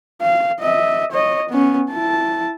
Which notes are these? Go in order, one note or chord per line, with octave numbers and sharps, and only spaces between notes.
F5
D#5 E5
C#5 D#5
B3 C#4
E4 A5